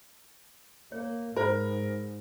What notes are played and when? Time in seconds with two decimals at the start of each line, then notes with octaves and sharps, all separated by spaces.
0.92 A#3 C#5
1.36 G#2 A#4 C5 B5